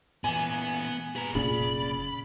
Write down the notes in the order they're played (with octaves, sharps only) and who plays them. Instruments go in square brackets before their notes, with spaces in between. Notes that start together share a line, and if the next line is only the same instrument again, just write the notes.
[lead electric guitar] A#2 E3 [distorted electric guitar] B3 [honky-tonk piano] G#5
[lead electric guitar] A#2 B4 [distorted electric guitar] G#4 A#5
[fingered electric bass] F1 A#2 [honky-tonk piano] C#3 [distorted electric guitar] D5 [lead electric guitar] B5